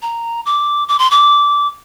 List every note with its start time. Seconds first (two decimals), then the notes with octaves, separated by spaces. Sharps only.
0.02 A#5
0.46 D6
0.88 D6
0.99 C6
1.11 D6